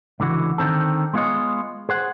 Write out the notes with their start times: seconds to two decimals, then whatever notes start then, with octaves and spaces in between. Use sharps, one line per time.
0.20 C#2 D3 E3 F#4
0.58 D3 D#3 C4 A4
1.13 G#3 B3 F4 F#4 C#5 D#5
1.89 G#4 C5 F#5